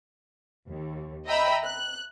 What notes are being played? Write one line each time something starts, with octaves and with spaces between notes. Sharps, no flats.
D#2
D#5 E5 G5 A#5 B5 E6
F#6